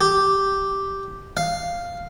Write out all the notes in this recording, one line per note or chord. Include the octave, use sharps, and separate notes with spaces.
G4
F5